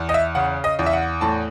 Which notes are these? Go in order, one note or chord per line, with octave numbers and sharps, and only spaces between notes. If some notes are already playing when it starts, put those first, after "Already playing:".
Already playing: E2
D#5
E5
C#3 F#5
D#5
E2
E5
F#5
A2 A5